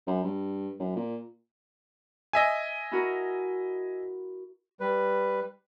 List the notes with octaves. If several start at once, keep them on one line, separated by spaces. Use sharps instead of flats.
F#2
G2
F#2
A#2
D#5 E5 G#5
E4 F#4 A#4
G3 B4